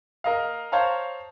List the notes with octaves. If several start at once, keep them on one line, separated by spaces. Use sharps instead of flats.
A#4 D#5 F5
C5 C#5 F5 A5 A#5